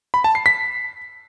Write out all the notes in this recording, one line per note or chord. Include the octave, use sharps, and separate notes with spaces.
B5
A5
C7
B6